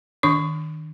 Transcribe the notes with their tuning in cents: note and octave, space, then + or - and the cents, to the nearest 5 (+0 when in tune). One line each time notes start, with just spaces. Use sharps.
D#3 +0 D4 -20 C#6 +0